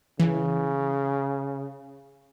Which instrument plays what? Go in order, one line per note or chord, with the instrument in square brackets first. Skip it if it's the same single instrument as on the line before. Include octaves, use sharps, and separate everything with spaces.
[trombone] C#3 [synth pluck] E3